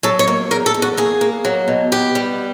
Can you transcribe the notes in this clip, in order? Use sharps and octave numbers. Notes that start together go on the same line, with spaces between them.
F#3 A4
C#5
A#3
E2 A#4
A4
E2
F#4
A#3 G#4
A#3
F#3
B2
B3 G4
G3